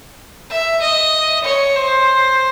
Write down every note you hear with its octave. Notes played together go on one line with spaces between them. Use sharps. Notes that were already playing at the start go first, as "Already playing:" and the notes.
E5
D#5
C#5
C5